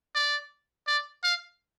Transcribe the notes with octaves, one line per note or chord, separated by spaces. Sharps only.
D5
D5
F5